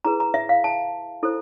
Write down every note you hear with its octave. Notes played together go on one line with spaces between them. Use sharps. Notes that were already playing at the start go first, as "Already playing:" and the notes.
E4 G#4 B4 A#5
A#5
E5
F5
A5
E4 A4 C5